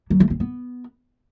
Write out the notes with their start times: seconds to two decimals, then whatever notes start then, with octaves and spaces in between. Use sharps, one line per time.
0.10 F#3
0.20 A3
0.30 C4
0.40 B3